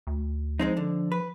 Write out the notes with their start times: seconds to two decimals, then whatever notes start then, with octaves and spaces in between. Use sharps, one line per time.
0.07 D2
0.59 F3 G#3 C4 D#4
0.77 D3
1.12 B4